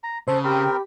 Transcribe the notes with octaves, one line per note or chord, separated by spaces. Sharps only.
A#5
C#3 A4 C5
C4 G4 A#4 B5